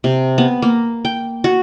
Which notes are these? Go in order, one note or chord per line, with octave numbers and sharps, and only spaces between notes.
C3
B3
A#3
G5
F#4